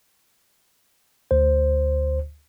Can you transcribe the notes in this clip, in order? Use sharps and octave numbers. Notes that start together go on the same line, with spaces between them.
D2 C5